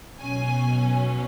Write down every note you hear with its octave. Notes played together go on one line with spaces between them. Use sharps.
B1 B2 F#3 C#4 G#5